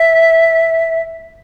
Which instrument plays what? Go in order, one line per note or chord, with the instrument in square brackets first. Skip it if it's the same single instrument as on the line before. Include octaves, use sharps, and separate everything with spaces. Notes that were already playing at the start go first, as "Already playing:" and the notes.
Already playing: [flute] E5